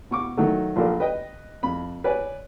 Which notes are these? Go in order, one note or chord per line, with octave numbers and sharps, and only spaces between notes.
B2 C#6 D6
D#3 F#3 A3
A#1 F4 A4 A#4 D5
B4 D#5 G5
F2 B5
B4 C#5 D5 G#5